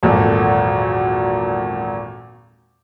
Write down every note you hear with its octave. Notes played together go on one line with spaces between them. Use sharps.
G#1 E2 A#2 F#3 A4